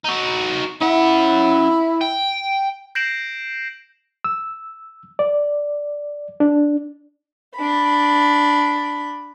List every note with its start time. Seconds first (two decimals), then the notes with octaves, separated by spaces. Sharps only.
0.05 D#4 F#4
0.81 C#4 E4 F#5
2.01 G5
2.95 G6 A#6 C7 D7 E7 F#7
4.24 E6
5.19 D5
6.40 D4
7.56 D4 B5